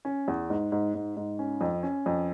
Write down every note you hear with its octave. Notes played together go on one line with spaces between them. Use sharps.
C#4
E2
G#2
G#2
G#2
G#2
C#4
F2
C#4
F2